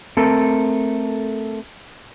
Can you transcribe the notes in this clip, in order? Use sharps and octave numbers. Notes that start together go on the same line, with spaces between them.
A3 C4 A4 A#4